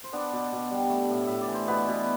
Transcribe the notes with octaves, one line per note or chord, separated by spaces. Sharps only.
C5
B3 D4 D5
B2
B2
G3
A3
A2
A2 E5
D5
E3
C5
B2 B3 B4
B2